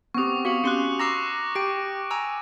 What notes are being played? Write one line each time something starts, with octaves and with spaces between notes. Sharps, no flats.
B3 C4 G4 C#6 D#6
F#4 F5 C#6 C#7 F#7
C#4 G4 C6 F#6 C#7
A#5 C#6 D6 E6 A#6 C7
G4 G5 D7
G#5 A#5 E6